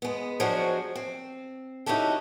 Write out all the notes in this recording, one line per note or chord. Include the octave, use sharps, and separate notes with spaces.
G#3 B3
F3 F#3 G#3 D4 F#4 C5
C4
C#4 D#4 E4 F#4 G4 A4